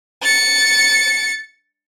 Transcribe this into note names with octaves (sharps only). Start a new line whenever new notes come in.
A6 C#7